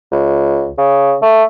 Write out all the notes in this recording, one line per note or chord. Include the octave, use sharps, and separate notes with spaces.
C#2
C#3
A3